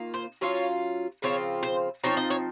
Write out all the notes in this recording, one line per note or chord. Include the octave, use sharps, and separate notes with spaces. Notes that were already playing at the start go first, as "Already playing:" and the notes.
Already playing: D#3 A#3 F4
C5
F#3 C#4 F4 C#5
C#3 F3 C4 F4 C#5
C5
F3 C4 D#4 C#5
D#5
C#5